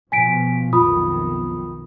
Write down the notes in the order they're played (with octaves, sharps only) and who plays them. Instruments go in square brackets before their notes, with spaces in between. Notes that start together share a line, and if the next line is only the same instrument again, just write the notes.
[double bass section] B2 F3 [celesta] G#5 B6 D7
[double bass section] B1 F2 D#3 [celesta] F4 B5 D#6